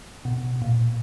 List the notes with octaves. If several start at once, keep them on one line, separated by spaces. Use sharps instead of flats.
B2
A#2